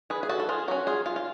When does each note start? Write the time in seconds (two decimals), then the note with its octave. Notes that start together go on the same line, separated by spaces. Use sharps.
0.10 G#4 B4
0.23 G#4
0.29 F#4 A4
0.40 A4
0.49 F4 G#4
0.68 F#3 C#4 F#4
0.87 F4 G#4
1.06 F4
1.16 F4